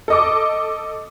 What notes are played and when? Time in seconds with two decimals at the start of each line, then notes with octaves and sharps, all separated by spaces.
0.08 A4 D#5 D6